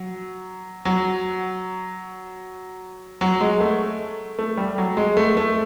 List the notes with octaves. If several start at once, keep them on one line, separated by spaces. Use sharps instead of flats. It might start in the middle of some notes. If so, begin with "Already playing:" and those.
Already playing: F#3
F#3
F#3
G#3
A3
A3
G3
F#3
G#3
A3
A3